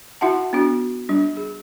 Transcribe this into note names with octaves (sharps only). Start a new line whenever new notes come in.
E4 F#4 E5 F#5 A5
B3 D4 F#4
G3 D4
G#4